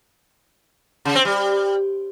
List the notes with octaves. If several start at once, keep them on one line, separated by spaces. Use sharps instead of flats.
C#3
C4
G3